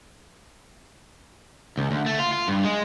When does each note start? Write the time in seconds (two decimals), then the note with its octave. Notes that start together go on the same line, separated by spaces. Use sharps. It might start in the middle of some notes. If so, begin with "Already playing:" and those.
1.77 C#2
1.91 D2
2.06 A3
2.19 F4
2.33 F4
2.48 G2
2.65 G#3